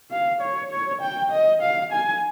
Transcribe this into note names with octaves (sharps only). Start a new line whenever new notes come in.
F5
C#5
C#5
G5
D#5
F5
G#5